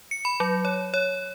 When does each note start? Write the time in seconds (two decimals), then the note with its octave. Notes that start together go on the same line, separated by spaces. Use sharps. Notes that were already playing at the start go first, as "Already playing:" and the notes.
0.11 C#7
0.25 B5
0.40 F#3
0.65 C#5
0.94 C#5